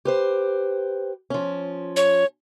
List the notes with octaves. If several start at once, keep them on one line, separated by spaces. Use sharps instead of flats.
G4 B4 C5
F3 C#4
C#5